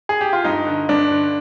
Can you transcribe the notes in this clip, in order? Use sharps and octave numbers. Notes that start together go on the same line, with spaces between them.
G#4
G4
F4
G2 D#4
D3
G2 D4
D3